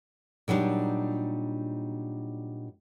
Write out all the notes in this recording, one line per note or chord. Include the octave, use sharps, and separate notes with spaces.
A#2 F#3 G3 D4 D#4